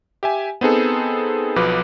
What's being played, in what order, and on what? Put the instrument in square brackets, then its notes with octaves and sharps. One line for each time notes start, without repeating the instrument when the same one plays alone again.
[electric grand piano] G4 E5 G#5
B3 C4 D#4 G#4 A4
B1 B2 F3 B4 D6